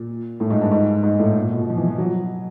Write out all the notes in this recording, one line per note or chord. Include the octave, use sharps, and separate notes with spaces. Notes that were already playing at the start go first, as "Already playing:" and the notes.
Already playing: A#2
A2
G#2
G2
G#2
G#2
A2
A#2
B2
F3
E3
F3
F#3